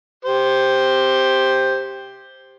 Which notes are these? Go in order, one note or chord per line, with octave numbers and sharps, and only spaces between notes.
G4 C5